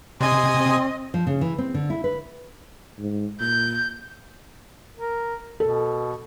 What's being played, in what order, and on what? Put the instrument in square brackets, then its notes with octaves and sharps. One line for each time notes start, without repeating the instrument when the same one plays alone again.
[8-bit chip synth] C3 G#5 D#6 [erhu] D#5 [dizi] C6
[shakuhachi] C4
[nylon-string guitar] F3
C#3
E3
C4
D3
E4
B4
[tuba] G#2
[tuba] A#2 [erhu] G6
[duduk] A#4
[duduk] B2 [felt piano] A4